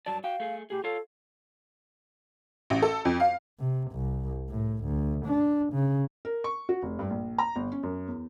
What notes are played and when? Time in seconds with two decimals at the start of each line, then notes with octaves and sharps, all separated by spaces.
0.06 G2 F#3 D5 A5
0.24 F#4 F5 G5
0.40 A3 G#4
0.70 A2 G4 G#4
0.84 F4 A4 C#5 F5
2.70 A1
2.82 A4
3.05 F2
3.20 F5
3.59 C3
3.92 C2
4.49 A2
4.85 D2
5.26 D4
5.73 C#3
6.25 A#4
6.44 C#6
6.69 F#4
6.82 F1
6.99 G2
7.10 A#1
7.38 A#5
7.56 G1
7.72 C#4
7.83 F#2
8.08 E2